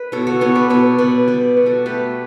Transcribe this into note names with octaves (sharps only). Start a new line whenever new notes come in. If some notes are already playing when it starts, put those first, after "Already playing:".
Already playing: B4
B2 A4 C#5
F#4 A4
B3 A4 C#5
B4 D5
B2 A4 C#5
B2 B4 D5
G3 B4 D5
B2
F#4 A4
A3 G4 B4